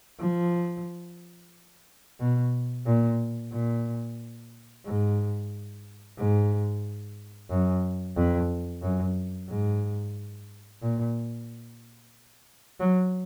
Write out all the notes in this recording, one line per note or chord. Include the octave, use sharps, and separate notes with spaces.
F3
B2
A#2
A#2
G#2
G#2
F#2
F2
F#2
G#2
A#2
F#3